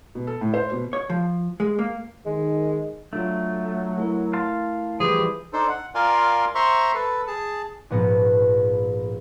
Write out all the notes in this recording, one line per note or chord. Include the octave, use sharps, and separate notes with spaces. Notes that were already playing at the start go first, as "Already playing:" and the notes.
B2
A4
A2
C5
B2
C#5
F3
G#3
A#3
D#3 G#3
F#3 A3 D4 F4
A3 E4 A#4
F5 A5 C6
E3 F3 G3 G4 G#4
D4 D#4 A4 C5
F#5
F4 A#4 D5 F5 G#5 C6
C5 E5 A#5 C6 C#6
A4 B4
G#4 A5
A#1 G#2 B3 A#6